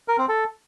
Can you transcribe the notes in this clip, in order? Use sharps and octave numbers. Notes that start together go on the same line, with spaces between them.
A#4
C4
A4